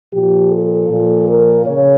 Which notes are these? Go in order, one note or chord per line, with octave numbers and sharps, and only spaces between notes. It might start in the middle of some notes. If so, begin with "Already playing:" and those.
A#2 F3 G4
A4
A#2 F3
A#4
C#3 C#5